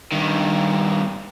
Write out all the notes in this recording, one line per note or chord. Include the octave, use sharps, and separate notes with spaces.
G2 D#3